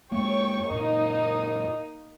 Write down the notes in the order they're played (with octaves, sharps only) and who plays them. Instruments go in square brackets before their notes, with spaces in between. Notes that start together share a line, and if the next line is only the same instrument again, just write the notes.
[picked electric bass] F#2 G#3 A#3 [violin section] C#5 G5 C#6
[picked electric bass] F#2 A#2 [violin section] A#3 D#4